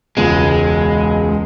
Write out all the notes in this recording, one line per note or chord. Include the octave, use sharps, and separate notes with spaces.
E1 C#2 G#3